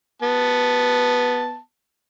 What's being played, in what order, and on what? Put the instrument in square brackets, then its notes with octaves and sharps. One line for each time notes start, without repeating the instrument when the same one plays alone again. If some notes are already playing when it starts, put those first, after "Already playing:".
[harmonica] B3 A5